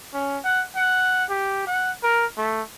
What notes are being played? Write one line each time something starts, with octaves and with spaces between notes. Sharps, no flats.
C#4
F#5
F#5
G4
F#5
A#4
A3